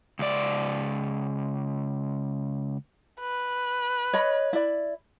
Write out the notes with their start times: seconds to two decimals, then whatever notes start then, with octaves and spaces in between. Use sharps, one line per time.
0.19 C#2 D5
3.20 B4
4.13 C#5 D#5 B5
4.53 E4 D5